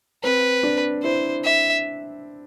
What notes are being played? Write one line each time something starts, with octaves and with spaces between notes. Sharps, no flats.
C4 B4
D4
E4 C5
E5